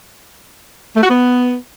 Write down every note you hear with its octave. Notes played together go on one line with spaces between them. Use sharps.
A3
F#4
B3